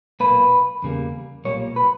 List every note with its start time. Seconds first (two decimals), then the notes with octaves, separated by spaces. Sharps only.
0.20 B1 A#2 A#3 B4
0.82 E2 C#3 G3 A#3
1.45 B1 A#2 G3 A#3 C#5
1.76 B4